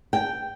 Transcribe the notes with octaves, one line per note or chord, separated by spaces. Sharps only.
G5